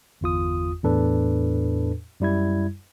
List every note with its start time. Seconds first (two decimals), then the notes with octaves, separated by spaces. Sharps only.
0.21 G1 E2 F4 D#6
0.84 E2 A2 D4 A4 B4
2.20 F#2 G3 E4 G#6